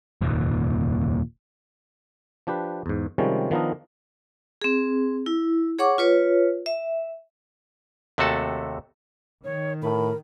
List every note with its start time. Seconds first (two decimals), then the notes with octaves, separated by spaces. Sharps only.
0.21 F1 D#2 A#2
2.47 F3 D4 G4 B4
2.86 E2 G#2
3.18 C3 D#3 F3 G3 G#3 C#4
3.51 D#3 F3 B3 D4 A#4 D#5
4.62 C4 G#4
5.26 E4
5.78 G#4 C#5 F#5 C#6 D6
5.98 F4 B4 C#5
6.66 E5
8.18 D#2 C3 A3 F#4 A4 A5
9.44 D#3 C#5
9.83 A2 A#4 B5